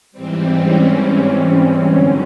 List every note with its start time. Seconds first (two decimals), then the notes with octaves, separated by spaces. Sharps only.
0.12 G#2 E3 G3 C4
0.56 C#4
1.88 F#2 D3 F#3